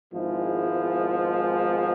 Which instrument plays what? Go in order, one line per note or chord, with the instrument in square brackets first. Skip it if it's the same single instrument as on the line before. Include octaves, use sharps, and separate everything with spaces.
[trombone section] G#1 G#2 F3 G#3 B3 E4